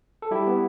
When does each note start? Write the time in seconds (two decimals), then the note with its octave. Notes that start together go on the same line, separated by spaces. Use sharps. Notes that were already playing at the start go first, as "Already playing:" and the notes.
0.22 A4
0.31 G3 E4 G4
0.47 B3